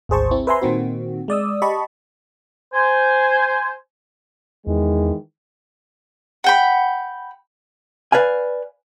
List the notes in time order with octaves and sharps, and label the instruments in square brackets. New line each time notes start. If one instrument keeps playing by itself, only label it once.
[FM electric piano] G#1 D2 G#4 C5 A5 C#6
C4 E4
B4 C5 E5 G#5 A#5 C6
A#2 D#3 C4 F#4
G#3 D5 D#6 E6
G4 D#5 A5 B5 C#6
[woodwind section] C5 G#5
[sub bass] E2 [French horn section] D#3 E3 G#3
[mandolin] F#5 G5 B5
[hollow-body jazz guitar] B4 D5 F5 G#5